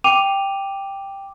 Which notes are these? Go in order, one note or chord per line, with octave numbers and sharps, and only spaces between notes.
G5 D6 D#7 F7